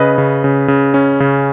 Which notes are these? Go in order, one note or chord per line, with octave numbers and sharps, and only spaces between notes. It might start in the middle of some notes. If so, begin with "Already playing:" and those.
Already playing: C#3 B4 D#5
C#3
C#3
C#3
C#4
C#3